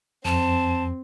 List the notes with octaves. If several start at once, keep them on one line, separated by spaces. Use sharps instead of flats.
F2 C4 A5